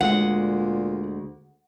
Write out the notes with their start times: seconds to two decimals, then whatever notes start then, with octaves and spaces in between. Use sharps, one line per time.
0.01 D2 A#2 G#3 F#5